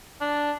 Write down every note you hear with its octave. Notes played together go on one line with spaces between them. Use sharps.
D4